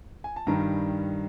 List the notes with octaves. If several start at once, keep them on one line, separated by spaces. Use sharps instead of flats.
G#5
A5
G2 D#3 G3 A#5